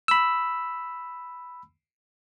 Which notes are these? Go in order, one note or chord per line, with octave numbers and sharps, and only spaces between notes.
B5 E6